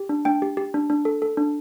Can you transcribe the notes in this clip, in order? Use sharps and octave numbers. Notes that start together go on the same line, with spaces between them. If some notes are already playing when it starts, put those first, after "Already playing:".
Already playing: G4
D4
D4 G5
G4
G4
D4
D4
A4
A4
D4